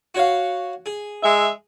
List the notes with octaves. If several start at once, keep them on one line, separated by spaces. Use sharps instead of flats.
F#4 C#5 F5
G#4
G#3 E5